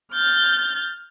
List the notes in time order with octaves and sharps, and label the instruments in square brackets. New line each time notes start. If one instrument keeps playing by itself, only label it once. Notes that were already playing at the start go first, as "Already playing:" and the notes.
[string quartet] F6 G6 A6